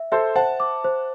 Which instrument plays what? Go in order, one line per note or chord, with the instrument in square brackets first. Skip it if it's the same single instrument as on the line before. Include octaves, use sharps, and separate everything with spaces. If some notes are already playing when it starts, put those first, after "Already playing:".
Already playing: [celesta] E5
[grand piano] A4 C5 [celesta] E5
[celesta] C5 [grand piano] F#5 A5
[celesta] D6
C5